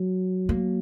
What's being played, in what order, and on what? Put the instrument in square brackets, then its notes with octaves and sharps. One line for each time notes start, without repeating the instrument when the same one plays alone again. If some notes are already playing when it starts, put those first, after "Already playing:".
Already playing: [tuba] F#3
[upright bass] A#3